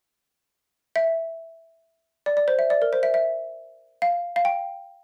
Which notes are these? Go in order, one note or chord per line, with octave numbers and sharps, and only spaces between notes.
E5
D5
D5
C5
E5
D5
A#4
C5
E5
E5
F5
F5
G5